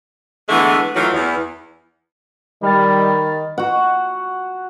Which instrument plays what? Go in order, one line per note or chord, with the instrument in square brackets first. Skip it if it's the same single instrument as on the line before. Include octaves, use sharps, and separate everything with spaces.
[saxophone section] D3 E3 G#3 A3 B3
D#3 E3 F#3 A3 F4
E2
[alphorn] D#3 [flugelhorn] G3 [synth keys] B5 F6 A6
[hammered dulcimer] F#4 F#5